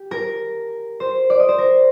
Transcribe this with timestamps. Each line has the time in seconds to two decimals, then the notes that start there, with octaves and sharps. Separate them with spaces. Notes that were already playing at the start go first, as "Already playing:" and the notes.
Already playing: G4
0.11 A#4
1.00 C5
1.30 D5
1.40 D#5
1.49 C5
1.58 A#4